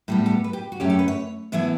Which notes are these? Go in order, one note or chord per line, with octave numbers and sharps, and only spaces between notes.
A2 G3 B3 G4
A4
B4
G4
F#4
F#2 D3 A3 C#4 G4
A4
B4
C#5
A2 E3 B3 E4 E5